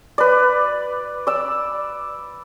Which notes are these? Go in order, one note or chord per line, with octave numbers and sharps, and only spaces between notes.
B4 D5
D5 E6